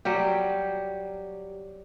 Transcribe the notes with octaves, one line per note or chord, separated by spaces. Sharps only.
F#3 G3 G4